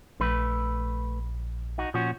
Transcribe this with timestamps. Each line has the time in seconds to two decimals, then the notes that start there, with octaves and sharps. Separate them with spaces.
0.20 A#1 A3 B4
1.78 D#4 F#4
1.94 A#2 F3 C#4 F#4